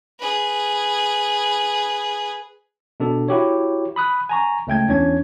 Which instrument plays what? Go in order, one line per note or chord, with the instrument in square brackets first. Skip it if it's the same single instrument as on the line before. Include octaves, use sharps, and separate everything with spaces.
[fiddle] G#4 B4
[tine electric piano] B2 D4 A4
E4 F#4 G4 C#5
B5 D#6 F#6
G#5 A#5 C#6
C#2 A3 G5 G#6
E2 E3 C#4 D4 C#5 G#6